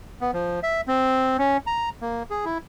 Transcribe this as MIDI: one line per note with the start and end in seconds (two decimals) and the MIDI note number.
0.21 0.31 59
0.33 0.60 53
0.63 0.81 76
0.88 1.37 60
1.38 1.57 61
1.67 1.89 82
2.01 2.23 58
2.30 2.45 68
2.45 2.58 64